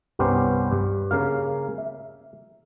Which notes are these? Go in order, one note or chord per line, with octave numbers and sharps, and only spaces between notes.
C2 G2 B3 C#4 G4 C5
G2
C#3 A#3 F5
E5